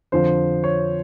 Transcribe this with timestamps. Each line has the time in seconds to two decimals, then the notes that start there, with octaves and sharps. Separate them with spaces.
0.12 F2 D3 F3 C5
0.64 C#5